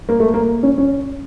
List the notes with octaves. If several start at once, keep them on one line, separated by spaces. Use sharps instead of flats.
A#3
A3
A#3
C#4
C#4